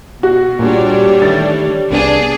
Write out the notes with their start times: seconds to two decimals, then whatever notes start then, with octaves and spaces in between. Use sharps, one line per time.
0.23 B2 F#4
0.59 A#2 G3 D4 G#4 C#5
1.22 D#3 E3 A3 A6
1.91 C2 B3 D4 G#4